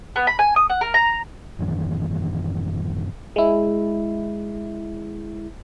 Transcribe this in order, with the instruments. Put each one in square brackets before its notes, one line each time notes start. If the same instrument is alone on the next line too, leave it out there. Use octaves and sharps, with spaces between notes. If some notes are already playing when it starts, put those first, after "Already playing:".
[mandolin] B3
B5
G#5
D#6
F#5
A#4
A#5
[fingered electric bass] A1 F#2 D#3 E3
[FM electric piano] G#3 E4